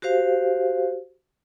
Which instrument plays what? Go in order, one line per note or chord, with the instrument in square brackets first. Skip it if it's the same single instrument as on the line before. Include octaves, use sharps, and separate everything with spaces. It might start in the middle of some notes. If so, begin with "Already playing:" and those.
[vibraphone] F#4 G4 C5 F5